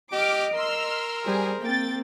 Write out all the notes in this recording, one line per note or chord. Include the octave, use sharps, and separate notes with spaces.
G4 D#5 D6 F6
A#4 C6 E6 F6
G3 G#4 C5
A#3 C4 G5 A6